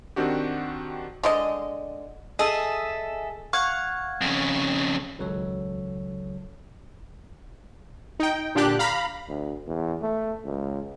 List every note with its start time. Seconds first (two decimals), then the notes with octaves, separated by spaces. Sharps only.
0.16 D#3 C4 D4 F#4 G4
1.23 D3 G#3 D#5
2.39 G#4 A4 D#5 E5
3.53 F5 F#5 C#6 G#6
4.21 F2 C#3
5.19 G#1 C#2 C#3 F#3 A4 C#5
8.20 D#4 G5
8.55 A#2 D3 D4 G4 F#6
8.79 F5 A#5 B5
9.29 D2
9.67 E2
10.02 A3
10.45 C#2